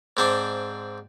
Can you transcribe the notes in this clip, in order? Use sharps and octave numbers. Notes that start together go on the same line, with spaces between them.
G#2 C4 D4